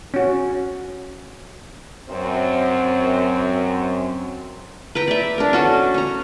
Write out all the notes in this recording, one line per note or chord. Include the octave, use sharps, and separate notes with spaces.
C#4 F#4
F#2 C4
B4 G5 A#5
D5 E5
D4 A#4
C#4 F#4 A4
C#4 A#5